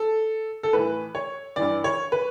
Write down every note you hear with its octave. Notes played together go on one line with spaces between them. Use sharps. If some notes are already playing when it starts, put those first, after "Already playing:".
Already playing: A4
A4
A2 E3 B4
C#5
G2 E3 D5
C#5
B4